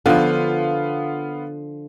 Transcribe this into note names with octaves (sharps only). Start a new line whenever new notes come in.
D3 F3 B3 F4